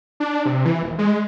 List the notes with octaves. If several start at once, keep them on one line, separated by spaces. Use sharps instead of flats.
D4
C3
E3
D#1
G#3